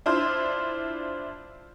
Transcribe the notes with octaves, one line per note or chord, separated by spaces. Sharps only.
D4 E4 F4 C5